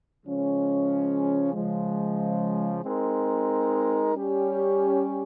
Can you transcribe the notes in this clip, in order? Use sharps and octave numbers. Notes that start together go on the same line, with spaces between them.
C#3 F3 G#3 C#4
C#3 F3 G#3
G#3 C4 D#4 A#4
G3 C#4 G4